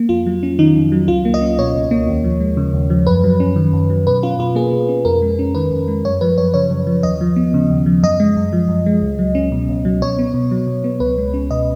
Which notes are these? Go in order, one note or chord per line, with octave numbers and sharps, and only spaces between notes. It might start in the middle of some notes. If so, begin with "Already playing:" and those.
Already playing: A#3
F2 F4
F#3
C#4
D#3 D#4
F2
F#3
C#2 F4
A#3
D#5
C#4
B2 C#5
C#2
A#3
D#2
F3
G#3
C#3
D#2
F3
F#2 B4
F#3
C#4
D#3
F#2
F#3
B2 B4
C#4 F4
B2 F4
A#3 G#4
B2
C#4
F2 A#4
G#3
C#4
D#3 B4
F2
G#3
F#2 C#5
F3 B4
F#2 C#5
C#3 C#5
F#2
F3
D#2 D#5
F3
B3
C#3
D#2
F3
F#2 D#5
G#3
F#2
F3
F#2
G#3
C#2
F#3
C#4
B2
C#2
F#3
B2 C#5
B3
B2
F#3
B2
B3
C#2 B4
G#3
C#4
B2 D#5